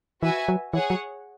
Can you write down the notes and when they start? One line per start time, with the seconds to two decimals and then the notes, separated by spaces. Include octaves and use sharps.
0.22 E3 F#4 B4 E5 G#5
0.48 F#3
0.74 E3 G#4 C#5 F#5
0.90 F#3